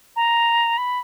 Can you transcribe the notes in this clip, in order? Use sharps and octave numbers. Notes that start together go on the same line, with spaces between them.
A#5
B5